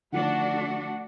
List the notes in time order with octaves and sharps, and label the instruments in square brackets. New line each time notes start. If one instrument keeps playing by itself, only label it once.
[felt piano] D3 D#3 F3 [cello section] A3 D4 F#4 [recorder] F#5